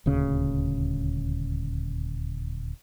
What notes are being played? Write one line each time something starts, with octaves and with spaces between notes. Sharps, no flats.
D#1 D2 C#3